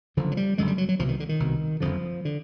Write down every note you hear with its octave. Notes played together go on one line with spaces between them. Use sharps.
F#1 F#2 D3 F3
F#3
G3
F#1 F#2 D3 G#3
G3
F#3
F#3
C2 B2 F3
D#3
D3
D#3
C2 B2
F#1 F2 D3 F3
D3